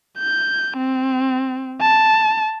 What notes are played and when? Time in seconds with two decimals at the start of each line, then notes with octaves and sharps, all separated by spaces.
0.18 G6
0.77 C4
1.81 A5